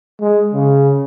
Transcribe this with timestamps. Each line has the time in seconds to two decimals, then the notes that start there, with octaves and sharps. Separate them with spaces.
0.21 G#3
0.54 C#3